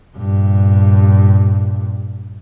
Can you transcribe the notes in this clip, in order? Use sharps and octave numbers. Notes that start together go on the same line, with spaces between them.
G2 A#2